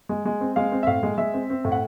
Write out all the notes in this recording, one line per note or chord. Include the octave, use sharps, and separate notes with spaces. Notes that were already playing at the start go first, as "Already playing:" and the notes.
G#3
G#3
C4
G#3 F5
C4
E5
A2 F5
G#3
G#3 E5
C4
C4
A2
F#5